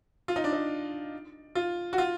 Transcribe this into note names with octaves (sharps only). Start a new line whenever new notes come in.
F4
D#4
D4
D#4
F4
F#4
F4